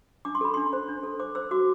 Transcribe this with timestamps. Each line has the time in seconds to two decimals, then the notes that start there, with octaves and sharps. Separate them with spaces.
0.25 D4 D6
0.35 C6
0.41 A4 B5
0.54 D4 C6
0.73 C5
0.88 D4
1.03 A4
1.20 C5 D6
1.35 C5 E6
1.51 F#4 D6